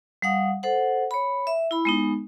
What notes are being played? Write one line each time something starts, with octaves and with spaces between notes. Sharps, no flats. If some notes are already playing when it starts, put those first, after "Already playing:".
G3 F5 F#5 D#6
A4 C5 F#5
C#5 B5
E5
E4 B5
G#3 B3 D#4